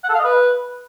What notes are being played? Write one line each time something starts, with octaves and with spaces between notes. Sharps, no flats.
F#5
A4
F5
D#5
B4